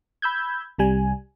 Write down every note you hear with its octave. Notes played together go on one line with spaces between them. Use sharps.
B5 E6 G6 G#6
C2 C3 G3 G#5